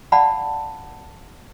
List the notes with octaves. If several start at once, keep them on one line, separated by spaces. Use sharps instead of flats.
D5 F5 F#5 A5 B5